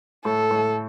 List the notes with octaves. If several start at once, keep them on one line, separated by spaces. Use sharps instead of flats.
A2 A4
A2